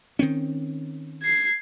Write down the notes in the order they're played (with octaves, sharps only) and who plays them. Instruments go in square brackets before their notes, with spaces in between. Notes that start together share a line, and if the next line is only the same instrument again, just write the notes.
[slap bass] D#3 C4 C#4
[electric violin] G#6 C7